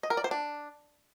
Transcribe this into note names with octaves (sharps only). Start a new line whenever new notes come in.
D#5
A#4
D5
C5
D4